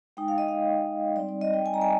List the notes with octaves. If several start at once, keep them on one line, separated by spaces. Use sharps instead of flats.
G#3 D#4 G5
F5
D#5
F5
G3 C4 D#4 D5
D5
D#5
G5
G#5
A#5
G#5